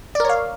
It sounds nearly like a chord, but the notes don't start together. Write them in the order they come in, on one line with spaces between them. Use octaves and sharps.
D5 A#4 C#5 F5